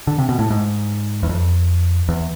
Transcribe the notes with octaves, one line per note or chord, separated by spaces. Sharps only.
D3
C3
B2
A2
G#2
E2
F2
E2